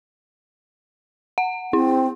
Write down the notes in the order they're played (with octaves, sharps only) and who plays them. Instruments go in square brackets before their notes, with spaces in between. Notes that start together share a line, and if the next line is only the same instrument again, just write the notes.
[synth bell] F#5
[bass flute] C4 [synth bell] E4